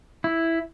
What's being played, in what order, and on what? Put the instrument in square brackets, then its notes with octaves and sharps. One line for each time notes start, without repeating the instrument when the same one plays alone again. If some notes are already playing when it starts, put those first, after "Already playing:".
[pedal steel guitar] E4